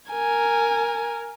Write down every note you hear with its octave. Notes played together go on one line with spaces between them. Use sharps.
A#4 G#5